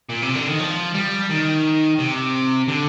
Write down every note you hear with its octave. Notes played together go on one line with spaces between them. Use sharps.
A#2
C3
D3
D#3
F3
G3
D#3
C3
D3